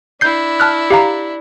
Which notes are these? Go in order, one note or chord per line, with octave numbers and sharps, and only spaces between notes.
D4 E4 G6 C7
A5 F6 F#6
G4 F5 A#5